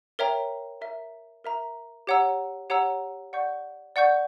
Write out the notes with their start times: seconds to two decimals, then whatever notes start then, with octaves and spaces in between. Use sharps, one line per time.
0.19 A#4 C#5 E5 G5 A#5
0.81 A#4 E5 A#5
1.44 A#4 E5 A#5
2.07 G4 C#5 F#5 A#5 E6
2.70 G4 C#5 F#5 A#5 E6
3.33 D5 F#5 C#6 G6
3.96 D5 F#5 C#6 G6